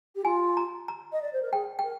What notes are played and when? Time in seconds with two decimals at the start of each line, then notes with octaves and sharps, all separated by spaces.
0.15 G4
0.24 F4 G#5
0.57 A#5
0.88 A#5
1.12 D#5
1.22 D5
1.33 C5
1.42 A#4
1.52 G#4 G5
1.79 G5
1.83 A#4